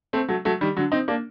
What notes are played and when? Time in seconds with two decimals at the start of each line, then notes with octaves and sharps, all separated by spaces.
0.13 A3 C4
0.28 F#3 A3
0.45 F#3 A3
0.61 D#3 G3
0.76 D3 F#3
0.92 C4 D#4
1.08 A#3 D4